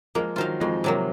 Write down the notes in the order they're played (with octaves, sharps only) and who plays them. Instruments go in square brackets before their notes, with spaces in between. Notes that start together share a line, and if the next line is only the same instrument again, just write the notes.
[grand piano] F3 G#3 [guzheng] A#3
[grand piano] D#3 F#3 [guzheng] F4 C5 F5
[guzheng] F2 [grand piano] F3 G#3
[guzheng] C3 F#3 A#3